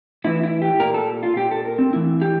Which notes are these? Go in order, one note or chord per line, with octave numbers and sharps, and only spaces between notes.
A2 E3 E4
E4
G4
A#2 A#4
A4
F4
A#2 G4
A4
A#4
C4
A2 E3 E4
G4